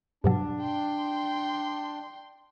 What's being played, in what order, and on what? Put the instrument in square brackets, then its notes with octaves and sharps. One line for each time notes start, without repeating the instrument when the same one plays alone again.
[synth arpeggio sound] G2 B2 F#3 [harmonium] D4
[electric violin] G5 C6